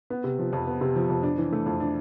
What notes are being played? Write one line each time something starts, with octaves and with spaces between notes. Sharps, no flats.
B3
C3
F3
F2
B3
C3
F3
F2
D4
E3
A3
F2
D4